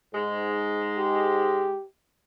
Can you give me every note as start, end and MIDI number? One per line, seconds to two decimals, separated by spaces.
0.14 1.74 44
0.14 1.74 56
0.98 1.85 67